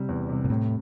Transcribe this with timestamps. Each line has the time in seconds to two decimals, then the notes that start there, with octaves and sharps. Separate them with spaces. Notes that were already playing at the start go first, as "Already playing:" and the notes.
Already playing: C3 G3
0.09 E2
0.29 C3 G3
0.45 A#2
0.50 A2 C3